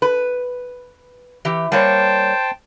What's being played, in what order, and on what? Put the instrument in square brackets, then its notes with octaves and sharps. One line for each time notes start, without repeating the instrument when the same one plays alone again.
[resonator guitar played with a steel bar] B4
E3 G4
[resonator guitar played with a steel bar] G3 A#3 C#5 [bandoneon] C5 G5 A5